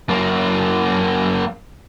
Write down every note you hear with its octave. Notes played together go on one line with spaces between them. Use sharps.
F#2 A#3